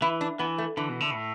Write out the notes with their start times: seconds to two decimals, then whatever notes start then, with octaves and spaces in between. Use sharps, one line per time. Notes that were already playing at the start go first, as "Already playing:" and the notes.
0.02 E3 E4
0.21 D4
0.39 E3 B3
0.58 A3
0.77 D3 E3
0.89 B2
1.00 D3
1.11 B2
1.14 A2